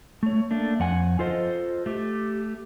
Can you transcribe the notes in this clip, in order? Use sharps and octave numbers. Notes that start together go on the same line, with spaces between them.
A3 C#5
A3 A#3 D4
F2 F#5 G#5
F4 A4 C5 D#5
A3 G4